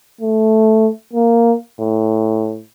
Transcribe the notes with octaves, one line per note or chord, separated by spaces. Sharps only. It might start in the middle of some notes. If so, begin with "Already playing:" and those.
A3
A#3
A2